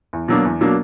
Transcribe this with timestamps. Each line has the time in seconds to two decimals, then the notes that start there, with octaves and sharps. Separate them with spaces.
0.13 E2
0.28 B2 F#3 A#3 D4
0.45 E2
0.61 B2 F#3 A#3 D4